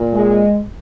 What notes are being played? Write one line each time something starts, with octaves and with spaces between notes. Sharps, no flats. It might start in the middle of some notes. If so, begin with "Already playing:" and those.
Already playing: A#2
G#3